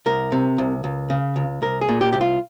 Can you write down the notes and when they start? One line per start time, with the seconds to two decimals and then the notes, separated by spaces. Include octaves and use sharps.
0.06 C2 A#4
0.32 C3
0.58 C2
0.84 C#2
1.10 C#3
1.36 C#2
1.62 C2 A#4
1.81 G#4
1.89 A#2
2.01 G4
2.13 C2 G4
2.21 F4